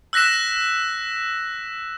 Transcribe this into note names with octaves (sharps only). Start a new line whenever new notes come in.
E6 F#6 A#6 B6 E7